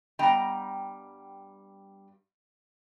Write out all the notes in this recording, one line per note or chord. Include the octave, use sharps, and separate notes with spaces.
G2 G3 B3 D#5 G5 A#5